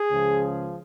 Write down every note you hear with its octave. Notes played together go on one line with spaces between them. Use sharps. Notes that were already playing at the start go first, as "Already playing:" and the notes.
Already playing: G#4
C#2 C#3 F3